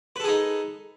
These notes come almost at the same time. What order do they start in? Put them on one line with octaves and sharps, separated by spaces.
B4 A4 G#4 D#4